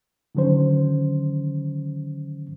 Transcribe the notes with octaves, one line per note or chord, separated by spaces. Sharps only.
D3 D#3 F#3 C#4 C5